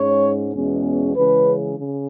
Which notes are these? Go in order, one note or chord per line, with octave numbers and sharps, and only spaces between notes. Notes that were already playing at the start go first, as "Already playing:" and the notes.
Already playing: G#2 G#3 C#4 C#5
E2 B2 G#3 C#4
C#3 E3 G#3 C#4 B4
C#3